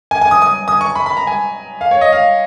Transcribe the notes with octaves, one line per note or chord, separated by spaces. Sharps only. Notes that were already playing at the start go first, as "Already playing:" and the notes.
G#5
G#5
D#6
D#6
D#6
C#6
B5
B5
A#5
G#5
F5
C#5
D#5
F5